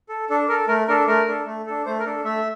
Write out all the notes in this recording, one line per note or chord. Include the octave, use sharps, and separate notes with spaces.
A4
D4 A4
A4 A#4
A3 A#4
D4 A4 A#4
A3 A#4
D4 A4
A3
D4 A4
A3 C5
A#4
D4 A4
A3 E5